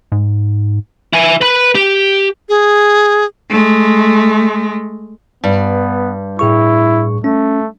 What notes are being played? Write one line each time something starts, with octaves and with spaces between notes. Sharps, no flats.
G#2
E4 G#5
B4 B5
G4
G#4
G#3 A3
G2 B3
A2 E4 G#4 C#6
A3 C#4